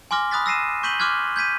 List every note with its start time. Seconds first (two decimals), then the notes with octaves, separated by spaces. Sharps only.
0.11 G#5 C6 D6 F6 A#6
0.31 B5 D#6 F#6 A6 B6
0.46 E6 A#6 C7 D#7 E7
0.83 C#6 G6 B6 D#7 F#7 G7
0.99 C6 D6 F6 F#6 G#6 B6
1.36 G6 G#6 B6 D#7